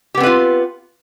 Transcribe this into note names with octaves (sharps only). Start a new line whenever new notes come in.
B3 C4 F4 G4 B4